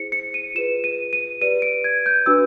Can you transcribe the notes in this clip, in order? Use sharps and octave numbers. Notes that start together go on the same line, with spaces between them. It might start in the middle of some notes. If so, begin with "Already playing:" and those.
Already playing: E4 G#4 C5 C#7
C#7
D#7
F4 G#4 B4 E7
D#7
D#7
G4 B4 D5 D#7
D7
G#6
G6
D4 F#4 B4 E6